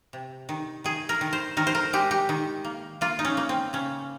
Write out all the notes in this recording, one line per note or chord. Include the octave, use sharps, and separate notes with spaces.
C3
D#3
D#3 G#4
A#4
D#3
C5
D#3 A#4
C5
A#4
G#3 G4
G4
D#3
A#3
A#3 F4
D#4
C#4
A#3
C4
C#3 C#4